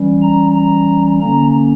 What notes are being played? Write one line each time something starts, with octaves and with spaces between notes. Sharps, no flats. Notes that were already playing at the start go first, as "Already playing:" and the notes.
Already playing: E3 G3 C#4
A#5
A#5
D3 A#3 C#4 A#5